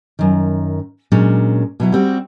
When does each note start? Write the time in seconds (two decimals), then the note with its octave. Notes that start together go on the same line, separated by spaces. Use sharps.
0.19 F#2 D#3
1.12 A#2 F#3 G#3 C#4 D4
1.80 B2 F#3 E4
1.92 G3 C4 F#4